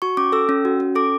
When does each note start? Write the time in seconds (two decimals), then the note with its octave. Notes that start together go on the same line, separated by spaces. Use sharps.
0.02 F#4 C#6
0.17 C#4 D6
0.32 A4 E6
0.49 C#4
0.65 F#4
0.80 C#4
0.95 A4 D6